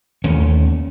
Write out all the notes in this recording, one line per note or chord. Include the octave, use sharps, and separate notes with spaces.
D#2 A3 C#4